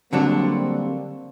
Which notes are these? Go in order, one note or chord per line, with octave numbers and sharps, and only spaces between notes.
D3 F#3 G3 A#3 C4 D4